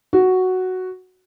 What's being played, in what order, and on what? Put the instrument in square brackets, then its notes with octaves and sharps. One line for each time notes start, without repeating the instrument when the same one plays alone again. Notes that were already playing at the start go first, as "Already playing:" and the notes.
[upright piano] F#4